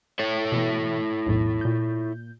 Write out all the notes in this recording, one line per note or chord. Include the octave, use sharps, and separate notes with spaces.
E4 A4 C#5
B2 E3
B1 E2 A2
A#2 G6